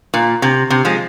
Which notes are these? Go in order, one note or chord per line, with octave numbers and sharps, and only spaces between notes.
A#2
C3
C3
F3 G#3